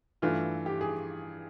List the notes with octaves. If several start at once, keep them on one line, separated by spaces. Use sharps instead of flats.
G2 E3 A3 F4
G4
G#4